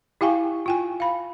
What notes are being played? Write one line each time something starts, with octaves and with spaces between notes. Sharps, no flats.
E4 G4 F5 G5 G#5 C#6
F4 G5 G#5
F5 B5